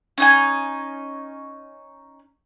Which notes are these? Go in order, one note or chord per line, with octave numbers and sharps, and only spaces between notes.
C#4 D#4 G#5